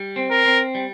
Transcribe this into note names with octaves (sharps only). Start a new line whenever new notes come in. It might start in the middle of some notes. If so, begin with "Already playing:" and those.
Already playing: G3
C4
A#4
C4
G3